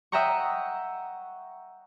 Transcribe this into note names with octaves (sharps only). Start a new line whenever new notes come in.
D#5 E5 F#5 G5 A#5 C#6